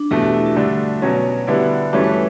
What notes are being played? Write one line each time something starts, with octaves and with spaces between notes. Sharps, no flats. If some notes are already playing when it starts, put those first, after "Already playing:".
Already playing: D4
E2 B2 A3 G4
F#4
E4
F#4
G2 D3 A3 D4
B2 F#3 C#4
D3 G3 B3 E4
G2 E3 A3 C#4 F#4
B4